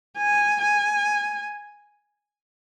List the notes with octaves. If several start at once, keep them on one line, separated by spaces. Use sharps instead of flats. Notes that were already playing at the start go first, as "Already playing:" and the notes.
G#5
G#5